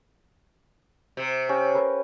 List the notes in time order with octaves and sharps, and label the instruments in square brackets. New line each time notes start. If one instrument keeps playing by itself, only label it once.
[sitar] C3
[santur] C#4 G4 G5
A#4 B4 C#5